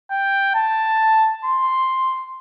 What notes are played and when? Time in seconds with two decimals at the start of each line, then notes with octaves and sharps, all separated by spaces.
0.11 G5
0.54 A5
1.44 C6